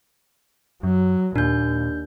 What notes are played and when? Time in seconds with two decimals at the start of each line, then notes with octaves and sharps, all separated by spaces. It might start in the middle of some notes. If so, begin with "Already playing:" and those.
0.83 F#2 F#3
1.36 D#2 A#2 D4 G6